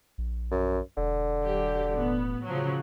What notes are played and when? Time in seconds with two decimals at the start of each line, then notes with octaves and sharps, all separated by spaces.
0.18 A#1
0.51 F#2
0.97 E1 D3
1.43 F#3 G4
1.94 A1 B3
2.46 C#3 F3 F#3